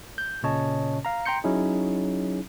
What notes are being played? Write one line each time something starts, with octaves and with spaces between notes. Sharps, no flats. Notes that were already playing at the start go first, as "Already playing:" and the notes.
G6
A#2 C#3 C#4 C#5 D#5 A5
F5 A#5
G5 A#5 C6 G6 C#7
F#3 C#4 D#4 E4 G#4